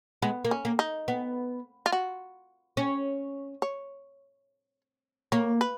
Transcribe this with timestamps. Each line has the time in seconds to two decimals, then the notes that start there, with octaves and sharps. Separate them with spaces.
0.22 G#3 B3
0.45 A#3
0.51 C#4
0.65 A#3
0.79 D#4
1.08 B3
1.86 F4
1.92 F#4
2.77 C#4
3.62 C#5
5.32 A#3 C#5
5.61 B4